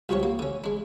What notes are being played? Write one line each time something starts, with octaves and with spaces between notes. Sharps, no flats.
C2 F3 F#4 G4 C#5
A#3
D3 C#4
G#3 D4